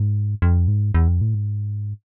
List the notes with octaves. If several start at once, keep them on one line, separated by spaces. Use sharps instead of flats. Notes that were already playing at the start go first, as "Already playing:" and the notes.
Already playing: G#2
F2
G#2
E2
F2
A2
G#2